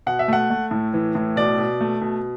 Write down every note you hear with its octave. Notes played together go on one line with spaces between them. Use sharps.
B2 F#5
E5
A3 F#5
A3
A2
E3
A2
B2 D5
B2
A3
B2